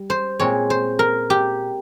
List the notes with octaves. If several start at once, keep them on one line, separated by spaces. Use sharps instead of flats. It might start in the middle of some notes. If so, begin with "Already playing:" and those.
Already playing: G3
C5
A#2 G#3 C4 C#5
C5
A#4
G4